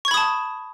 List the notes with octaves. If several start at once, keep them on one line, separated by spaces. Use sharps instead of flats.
A5 B5 C#6 D#6 G#6